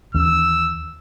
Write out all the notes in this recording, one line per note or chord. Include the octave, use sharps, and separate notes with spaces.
D#2 E3 C#4 E6